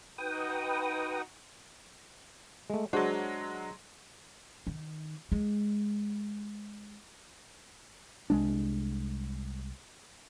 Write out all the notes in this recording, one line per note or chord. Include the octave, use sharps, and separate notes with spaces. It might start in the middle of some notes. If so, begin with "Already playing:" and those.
D#4 F#4 B4 G5 D#6
G#3 A3
F#3 G#3 D4 F#4 C5
D#3
G#3
C2 G#3 D4